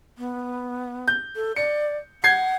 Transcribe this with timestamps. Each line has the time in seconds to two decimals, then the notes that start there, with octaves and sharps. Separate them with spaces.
0.18 B3
1.08 G6
1.36 A4
1.56 D5 C#7
2.24 F#5 G6 G#6 C7